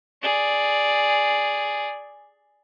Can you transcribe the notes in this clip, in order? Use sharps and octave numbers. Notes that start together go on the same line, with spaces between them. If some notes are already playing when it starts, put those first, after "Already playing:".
G#4 D5